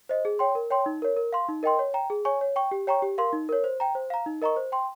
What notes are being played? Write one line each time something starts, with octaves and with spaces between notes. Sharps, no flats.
C5 D#5
G#4
C#5 G5 C6
A#4
C#5 G5 C6
D#4
A#4 C#5
A#4
F5 C6
D#4
A#4 D#5 G5 C6
C#5
G5 A#5
G#4
C#5 G#5 C#6
C#5
G5 C#6
G4
C#5 G5 A#5 C#6
G4
A#4 F5 C6
D#4
A#4 C#5
C5
G5 A#5
C5
F5 A#5
D#4
A#4 D#5 A#5 C#6
C5
G5 C6